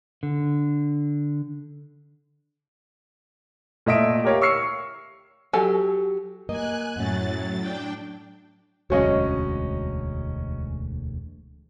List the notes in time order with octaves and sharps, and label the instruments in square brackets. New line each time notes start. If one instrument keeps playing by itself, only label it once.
[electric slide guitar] D3
[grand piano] A#2 A3 D#5 E5 D#6 D7
G4 A#4 C#5 F5
C#6 E6 F6 C7 C#7
[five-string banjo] F#3 F#4 G4 A4 G#5
[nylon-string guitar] A#3 D#5 [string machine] G#5 F#6
[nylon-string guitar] F#2 C#4 [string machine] A2 F#3 A6
[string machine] D4 G5
[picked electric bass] E1 D2 G#3 [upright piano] F#3 C#4 D#5